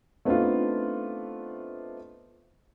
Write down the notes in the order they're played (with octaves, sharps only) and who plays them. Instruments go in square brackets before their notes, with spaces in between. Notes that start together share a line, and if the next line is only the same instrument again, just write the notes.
[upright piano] A3 B3 C4 D4 D#4 F4